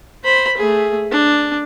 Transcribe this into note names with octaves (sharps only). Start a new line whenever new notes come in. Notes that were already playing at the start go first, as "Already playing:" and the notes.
C5 B5
A3 G#4
D4